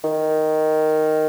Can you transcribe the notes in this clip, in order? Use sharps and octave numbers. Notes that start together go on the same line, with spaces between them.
D#3